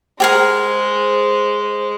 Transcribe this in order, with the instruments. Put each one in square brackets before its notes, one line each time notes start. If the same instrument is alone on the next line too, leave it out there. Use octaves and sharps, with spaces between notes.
[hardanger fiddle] G#3 [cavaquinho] G4 G#4 A#4 [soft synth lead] C5